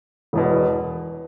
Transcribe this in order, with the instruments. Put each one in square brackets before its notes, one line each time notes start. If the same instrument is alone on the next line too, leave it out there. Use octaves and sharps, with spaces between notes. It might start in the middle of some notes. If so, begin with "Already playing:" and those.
[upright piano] E1 E2 B2